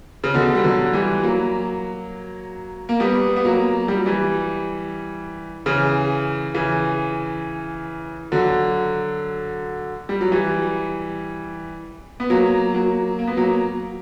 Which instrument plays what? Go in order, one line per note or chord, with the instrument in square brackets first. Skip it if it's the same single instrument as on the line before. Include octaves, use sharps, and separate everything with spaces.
[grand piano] C#3
B2 D3
G3
D3 F#3
E3 G3
F#3 A#3
A#3
G3 B3
B3
F#3 A#3
G3
F#3
E3 G3
C#3 E3
C#3 E3
D3 F#3
G3
F#3
E3 G3
B3
F#3 A#3
F#3 A#3
A#3
B3
F#3 A#3